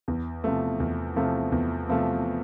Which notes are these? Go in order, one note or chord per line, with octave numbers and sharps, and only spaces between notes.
E2
C3 F3 A3
E2
C3 F3 A3
E2
C3 F3 A3